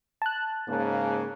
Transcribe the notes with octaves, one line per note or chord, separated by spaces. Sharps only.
A5 F#6
G#2 C#3 A#3